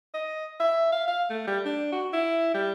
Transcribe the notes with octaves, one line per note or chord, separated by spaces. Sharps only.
D#5
E5
F5
F5
A3
G3
D4
F#4
E4
G3